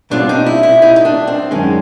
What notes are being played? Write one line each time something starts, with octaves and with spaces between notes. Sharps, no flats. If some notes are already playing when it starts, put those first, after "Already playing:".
B2 G3 C4 D4 F4
D#4
E4
E4
D#4
D#4
D4
C4
F#2 D#3 G#3 C#4